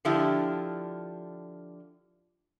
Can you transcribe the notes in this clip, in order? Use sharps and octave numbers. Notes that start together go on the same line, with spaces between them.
D3 F3 D4 E4 F4 G4